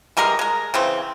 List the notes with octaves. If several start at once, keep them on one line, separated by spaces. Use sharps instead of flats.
E3 G3 G#3 A#4
G#3 A#4
C#3 E3 C4